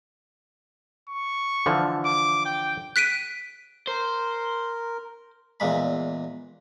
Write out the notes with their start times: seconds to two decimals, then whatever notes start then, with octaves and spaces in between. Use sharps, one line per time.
1.10 C#6
1.66 D3 E3 F3
2.05 D6
2.46 G5
2.96 F#6 B6 D7 D#7
3.87 A#4 C5
5.60 E2 A#2 G#3 B5